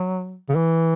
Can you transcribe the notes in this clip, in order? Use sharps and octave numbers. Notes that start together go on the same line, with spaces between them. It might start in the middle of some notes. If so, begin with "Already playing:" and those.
Already playing: F#3
C#3
E3